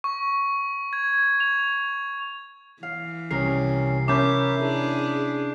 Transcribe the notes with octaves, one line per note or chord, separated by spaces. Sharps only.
C#6
G#6
F7
E3 F5
C2 C#4 A#4 C7
C#4 A#4 E5 A5 B5 D6 G6
D4 E4 G#4